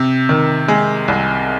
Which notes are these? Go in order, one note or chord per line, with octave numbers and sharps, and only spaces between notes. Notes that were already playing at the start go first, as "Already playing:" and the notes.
Already playing: C3
D#3
G#3
C2